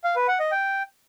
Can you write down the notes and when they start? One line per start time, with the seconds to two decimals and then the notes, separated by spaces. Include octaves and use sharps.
0.04 F5
0.16 B4
0.28 F#5
0.40 D#5
0.52 G5